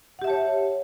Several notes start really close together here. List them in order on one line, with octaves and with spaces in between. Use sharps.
F#5 G4 E5 A5 C#5